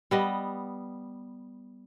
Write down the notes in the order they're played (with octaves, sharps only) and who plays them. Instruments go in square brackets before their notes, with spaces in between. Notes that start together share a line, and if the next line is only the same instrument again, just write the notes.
[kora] G3 B3 D#5